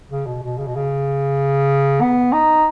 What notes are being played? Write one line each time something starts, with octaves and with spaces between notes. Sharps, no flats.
C#3
B2
B2
C#3
B2
C#3
B3
D#4